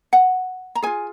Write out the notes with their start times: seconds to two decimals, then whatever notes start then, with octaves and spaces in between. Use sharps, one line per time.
0.13 F#5
0.75 A#5
0.82 F4 G#4 G#5